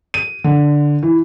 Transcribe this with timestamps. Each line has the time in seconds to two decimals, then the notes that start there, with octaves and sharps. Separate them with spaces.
0.14 D#7
0.44 D3
1.03 E3